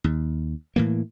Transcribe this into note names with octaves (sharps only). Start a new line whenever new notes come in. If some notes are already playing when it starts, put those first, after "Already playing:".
D#2
A2 E3 A#3